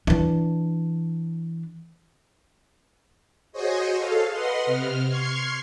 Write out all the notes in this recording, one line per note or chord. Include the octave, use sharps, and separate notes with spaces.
E3 D4
F#4 G#4 C5 C#5 D#5
A4 F5
B4 D#5 F#5 C6
C3 F6
C6 C#6 F6 G#6 C7